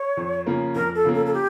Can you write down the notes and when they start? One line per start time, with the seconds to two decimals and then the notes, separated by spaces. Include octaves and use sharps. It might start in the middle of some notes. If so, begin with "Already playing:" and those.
Already playing: C#5
0.17 F2
0.46 C#3 F3 A#3
0.75 F2 A#4
0.95 A4
1.05 C#3 F3 A#3
1.14 A4
1.26 A4
1.34 G4